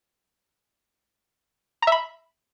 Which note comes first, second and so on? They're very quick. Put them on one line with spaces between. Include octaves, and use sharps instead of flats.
A#5 E5 B5